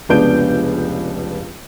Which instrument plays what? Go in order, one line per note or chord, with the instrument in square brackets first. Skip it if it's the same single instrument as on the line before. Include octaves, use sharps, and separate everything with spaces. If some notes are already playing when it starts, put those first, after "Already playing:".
[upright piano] F1 C#2 B3 D4 G6 D7